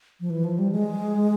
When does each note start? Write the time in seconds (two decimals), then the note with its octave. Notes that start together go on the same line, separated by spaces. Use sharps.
0.20 F3
0.30 E3
0.44 F3
0.58 G3
0.72 G#3